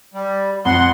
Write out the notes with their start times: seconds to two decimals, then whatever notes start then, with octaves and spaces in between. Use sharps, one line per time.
0.14 G3
0.65 F2 F#5 C6